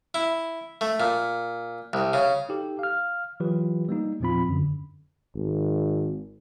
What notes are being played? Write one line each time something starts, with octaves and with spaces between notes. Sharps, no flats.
E4
A3
A#2
C2
C#3
D#4 G4 A4
F5 F6
E3 F#3 F4 G4 B4
G3 A#3 D#4
E2 A#2 F3 C4 F4 B5
F#2 D3
G#1